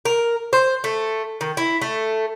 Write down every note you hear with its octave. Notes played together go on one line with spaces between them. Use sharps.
A#4
C5
A3
D#3
E4
A3